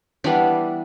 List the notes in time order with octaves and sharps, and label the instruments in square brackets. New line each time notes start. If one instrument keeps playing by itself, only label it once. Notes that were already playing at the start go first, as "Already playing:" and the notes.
[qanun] E3 G3 B3 D4